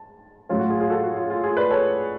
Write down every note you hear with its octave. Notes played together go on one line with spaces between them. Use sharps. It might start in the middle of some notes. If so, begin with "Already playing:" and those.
Already playing: A5
A2 F#3 C#4 F4
F#4
F4 G#4
F4 G#4
F#4 A4
F#4
F4
F4
F4 G#4
B4 D5
A4 C#5